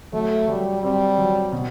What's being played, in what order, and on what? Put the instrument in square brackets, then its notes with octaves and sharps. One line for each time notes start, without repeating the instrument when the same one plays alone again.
[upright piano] F#3 [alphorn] A3
[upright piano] F#3 [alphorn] G3
[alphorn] G3 [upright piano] C4
[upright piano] F#3
B2